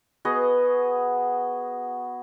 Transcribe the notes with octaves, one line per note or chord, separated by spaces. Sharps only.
B3 F#4 G#4 D#5